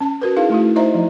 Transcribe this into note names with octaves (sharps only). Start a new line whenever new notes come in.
C#4 A5
F#4 A#4 B4
D#4 E4 G#4 F5
A3 E4 F#4
D#4 C5 D#5 E5 A#5
F3 E4